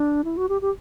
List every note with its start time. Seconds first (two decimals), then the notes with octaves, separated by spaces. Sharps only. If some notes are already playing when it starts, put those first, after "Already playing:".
Already playing: D4
0.25 E4
0.37 F#4
0.49 G4
0.62 G4